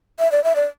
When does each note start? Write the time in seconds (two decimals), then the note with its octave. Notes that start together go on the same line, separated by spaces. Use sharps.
0.19 E5
0.32 D5
0.44 E5
0.56 D5